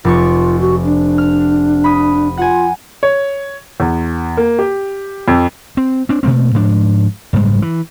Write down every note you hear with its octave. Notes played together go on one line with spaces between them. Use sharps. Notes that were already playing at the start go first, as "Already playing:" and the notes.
F1 F4 D5 C#6
F#4
D4
F6
B5 D#6
F4 F#5 G#5
C#5
E2
A#3
G4
F2
C4
C4 D4
B2 A3 A#3 C4
G#2 F3 D4
F#1 G#2 G3 G#3
E3